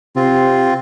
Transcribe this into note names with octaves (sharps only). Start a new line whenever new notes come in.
C3 C4 F4